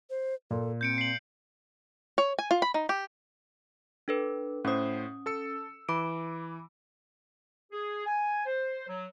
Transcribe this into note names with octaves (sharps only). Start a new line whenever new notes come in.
C5
A#2 A4
C4 G6 C#7 D7
C7 F#7
C#5
G#5
F4
B5
D#4
G4
D4 A4 B4
A2 C#4 C5 D#6
A4 E6 C#7
E3 B5 D6 D7
G#4
G#5
C5
F#3